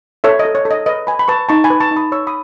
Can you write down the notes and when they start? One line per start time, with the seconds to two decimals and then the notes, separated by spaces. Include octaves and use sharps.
0.24 A4 C#5 E5
0.39 D#5
0.45 A4
0.55 C#5
0.65 A4
0.71 D#5
0.86 B4 D#5
1.07 B4 G#5 B5
1.19 B5
1.28 B4 A5 C#6
1.49 D#4 A5 C#6
1.64 G#5 B5
1.70 B4
1.80 A5 C#6
1.91 D#4
1.96 B5 D#6
2.12 C#5 C#6 E6
2.27 B5 D#6